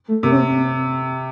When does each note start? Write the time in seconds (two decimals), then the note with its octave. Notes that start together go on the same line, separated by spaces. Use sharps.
0.08 A3
0.23 C3 A#3
0.32 C#4
0.37 C4